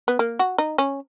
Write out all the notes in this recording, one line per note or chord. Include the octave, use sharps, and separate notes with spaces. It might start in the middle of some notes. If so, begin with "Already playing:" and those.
B3
A#3
F#4
D#4
C#4